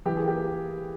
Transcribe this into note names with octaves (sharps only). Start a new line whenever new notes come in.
E3 G4
G#4
A#3
G4